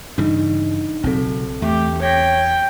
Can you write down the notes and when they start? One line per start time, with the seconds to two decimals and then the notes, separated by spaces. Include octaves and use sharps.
0.18 G2 C#3 E3 D4 D#4
1.04 B1 C#3 F#3 C4 A4
1.62 E2 A3 G4
2.01 C#5 G5 G6 A#6 B6